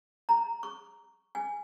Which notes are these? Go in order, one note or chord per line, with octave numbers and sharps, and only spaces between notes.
A#5
C#6
G#5